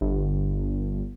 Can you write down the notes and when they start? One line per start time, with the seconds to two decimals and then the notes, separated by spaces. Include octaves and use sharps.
0.01 G1